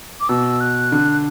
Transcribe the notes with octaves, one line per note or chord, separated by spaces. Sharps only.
D6
B2 E6
F#6
D3